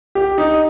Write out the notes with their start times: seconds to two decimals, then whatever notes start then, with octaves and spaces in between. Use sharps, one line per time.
0.15 G4
0.38 D#4